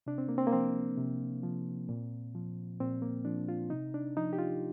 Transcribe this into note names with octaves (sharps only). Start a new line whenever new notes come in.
C3 D4
C4
A#3
C4
A#3
F3 C4
C3
F3
A#2
F3
A#2 C4
A#3
F3 D4
F4
C3 D#4
D4
F3 D#4
G4
F4